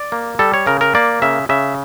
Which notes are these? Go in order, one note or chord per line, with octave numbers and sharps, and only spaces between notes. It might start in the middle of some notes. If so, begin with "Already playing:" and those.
Already playing: D5
A#3
G3 A4
C#5
C#3 A#4
A#4
A#3 D5
C#3 E5
C#3 E5